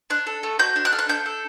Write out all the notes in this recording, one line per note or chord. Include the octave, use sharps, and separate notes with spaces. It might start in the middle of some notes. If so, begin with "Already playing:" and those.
D4 F#6
A4
A3
F#4 G6
D4
F#6
A4 F6
F#6
D4 G6
A4